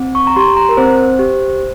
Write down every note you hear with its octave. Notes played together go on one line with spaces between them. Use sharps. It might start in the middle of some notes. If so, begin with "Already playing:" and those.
Already playing: C4
C#6
A#5
G4 C6
A#5
A#4
C4 C5
G4